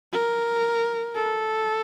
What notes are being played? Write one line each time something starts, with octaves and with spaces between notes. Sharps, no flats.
A#4
A4